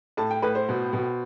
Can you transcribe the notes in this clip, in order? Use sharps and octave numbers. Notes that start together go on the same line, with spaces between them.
A2 A5
G5
A2 B4
C5
B2
B2